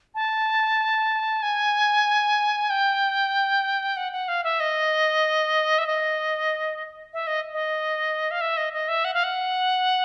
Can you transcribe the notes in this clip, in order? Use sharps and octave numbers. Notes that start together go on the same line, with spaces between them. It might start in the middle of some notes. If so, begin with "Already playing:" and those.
A5
G#5
G5
F#5
F#5
F5
E5
D#5
E5
D#5
E5
D#5
D#5
F5
E5
D#5
D#5
E5
F#5
F5
F#5